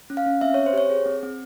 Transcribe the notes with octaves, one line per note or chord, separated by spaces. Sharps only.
C#4
F5
C#4
C4 E5
C#5
C4
C5
G4 C#5
G#4
C4
C4